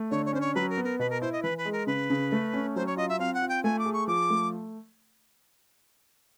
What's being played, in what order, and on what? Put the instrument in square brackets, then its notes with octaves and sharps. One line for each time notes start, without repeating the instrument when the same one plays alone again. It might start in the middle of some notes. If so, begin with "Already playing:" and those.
Already playing: [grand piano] A3
[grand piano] D3 [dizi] C#5
[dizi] C#5
[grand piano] C#4 [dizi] C5
[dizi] C#5
[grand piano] F#3 [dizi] B4
[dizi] A#4
[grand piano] B3
[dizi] A#4
[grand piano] B2 [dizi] B4
[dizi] A#4
[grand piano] E4 [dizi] C5
[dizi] D#5
[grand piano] E3 [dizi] B4
[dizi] B4
[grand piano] G#3
[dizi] A#4
[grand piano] C#3 [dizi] B4
[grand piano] C#3
A3
C#4
[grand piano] F#3 [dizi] C5
[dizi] C#5
[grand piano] F4 [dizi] D#5
[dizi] E5
[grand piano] C4 [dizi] F5
[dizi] F#5
[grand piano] F4
[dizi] G5
[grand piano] A3 [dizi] G#5
[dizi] D6
[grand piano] G#4
[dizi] C#6
[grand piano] F3 [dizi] D6
[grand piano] A3